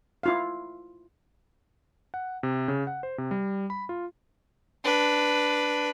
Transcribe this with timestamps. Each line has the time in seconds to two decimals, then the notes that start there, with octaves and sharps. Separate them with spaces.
0.23 E4 F4 F5
2.14 F#5
2.43 C3
2.68 C#3
2.87 F#5
3.03 C5
3.18 C3
3.31 G3
3.70 B5
3.89 F4
4.84 D4 B4